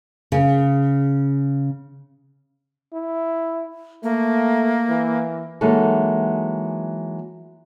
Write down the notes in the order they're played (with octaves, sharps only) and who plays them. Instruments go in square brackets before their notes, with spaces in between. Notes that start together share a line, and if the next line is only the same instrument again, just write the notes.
[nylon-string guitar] C#3
[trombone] E4
[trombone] A3 [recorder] A#3
[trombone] E3
[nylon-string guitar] E3 F#3 G#3 A#3 D#4 A4